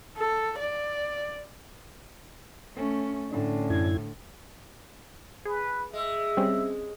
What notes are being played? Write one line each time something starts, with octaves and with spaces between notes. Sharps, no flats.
A4
D5
A3 C#4
A2 D3 C#4 D4
F#2 E4 G#6
G#4 B4
G#3 E5
G3 C4 C#4